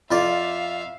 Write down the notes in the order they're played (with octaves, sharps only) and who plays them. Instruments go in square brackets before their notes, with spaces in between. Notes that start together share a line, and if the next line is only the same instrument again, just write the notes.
[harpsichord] F2 F4 D5 [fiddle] E5 F5